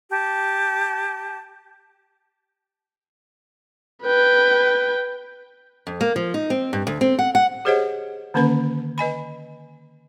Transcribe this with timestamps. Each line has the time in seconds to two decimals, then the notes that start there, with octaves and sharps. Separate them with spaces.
0.11 G4 A5
4.04 B4 G5
5.87 F2
6.01 A#3
6.16 F3
6.34 D#4
6.50 C4
6.73 G2
6.87 D2
7.01 C4
7.19 F#5
7.35 F#5
7.65 G4 G#4 C5 C#5 D#5 F#5
8.34 D3 D#3 A#3 C#4 B4 B5
8.98 B4 D#5 G#5 B5